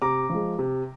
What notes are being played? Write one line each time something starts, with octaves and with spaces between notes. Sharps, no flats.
C3 A#5 D6
F3 G#3
C3